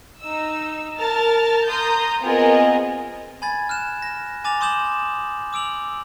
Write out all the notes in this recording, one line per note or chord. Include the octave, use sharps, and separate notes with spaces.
D#4 E6
A#4 A5 F6 A6
A#5 C6 D#6 G6
B3 C4 F4 G#4 A#4 D#5
G#5 B5 G#6 A6
F6 F#6 E7
A#6
G#5 D6 A6 F7
C6 D6 D#6 G6 E7 F#7
D6 E6 D7 F7 F#7